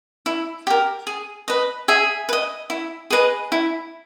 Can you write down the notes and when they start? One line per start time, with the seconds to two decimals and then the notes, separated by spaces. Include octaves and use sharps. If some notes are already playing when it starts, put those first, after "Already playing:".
0.26 E4
0.67 G4 A#4
1.07 G#4
1.48 B4 D#5
1.88 G#4 E5 G#5
2.29 B4
2.33 D#5
2.70 E4
3.10 G#4 B4 D#5
3.52 E4